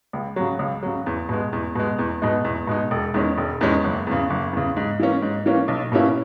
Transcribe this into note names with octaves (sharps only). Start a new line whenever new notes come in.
C#2
C#3 F#3
C#2
C#3 F#3
E2
B2 G#3
E2
B2 G#3
E2
B2 G#3 D#4
E2
B2 G#3 D#4
E1
E2 D#3 G#3 C#4
E1
E2 D#3 G#3 C#4
F#1
E2 C#3
F#1
E2 C#3
G#2
E3 A#3 C#4
G#2
E3 A#3 C#4
B1
B2 A#3 C#4 E4